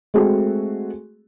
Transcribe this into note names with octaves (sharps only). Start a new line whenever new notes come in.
G#3 A3 C4 F#4 G#4 A4